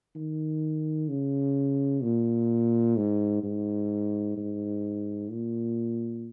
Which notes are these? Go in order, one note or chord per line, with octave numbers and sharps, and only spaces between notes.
D#3
C#3
A#2
G#2
G#2
G#2
A#2